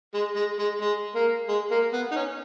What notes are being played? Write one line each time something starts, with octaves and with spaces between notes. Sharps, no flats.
G#3
G#3
G#3
G#3
A#3
G#3
A#3
B3
D#4
C#4